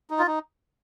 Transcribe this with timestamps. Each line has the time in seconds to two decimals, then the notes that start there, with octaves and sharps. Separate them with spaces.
0.10 D#4
0.19 F4
0.27 D#4